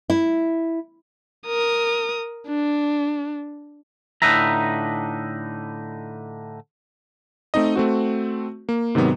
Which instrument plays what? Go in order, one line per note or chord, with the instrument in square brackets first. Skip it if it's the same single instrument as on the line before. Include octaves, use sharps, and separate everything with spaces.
[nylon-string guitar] E4
[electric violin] A#4 D#6
D4
[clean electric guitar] A2 D3 D#4 B4 E5 A#5
[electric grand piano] A3 C4 D#4 D#5
A3 C4 F#4
A#3
G#2 C3 D#3 F#3 B3